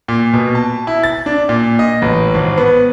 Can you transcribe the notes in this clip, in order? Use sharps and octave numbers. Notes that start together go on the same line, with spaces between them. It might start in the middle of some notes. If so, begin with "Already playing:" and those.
A#2
B2
A5
E4
A6
D4
A#2
D#5
A1
G#1
B3